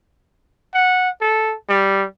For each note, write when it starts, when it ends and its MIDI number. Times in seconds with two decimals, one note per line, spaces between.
0.74 1.09 78
1.21 1.54 69
1.69 2.05 55